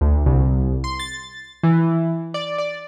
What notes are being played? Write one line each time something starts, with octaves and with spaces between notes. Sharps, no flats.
D2
C2
C6
A6
E3
D5
D5